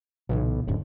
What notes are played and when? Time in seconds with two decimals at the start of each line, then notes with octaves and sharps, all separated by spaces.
0.29 B1 A#2 C#3 E3
0.67 D1 E2 G#2 D3